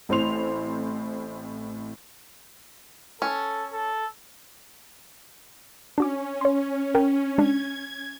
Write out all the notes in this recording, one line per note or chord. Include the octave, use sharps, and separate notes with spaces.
A1 A2 C4 C5 C6 F7
C#4 A4
A4
C#4 D4 F#4 D6
C#5 C6
A#4 G5
G#3 D4 G#6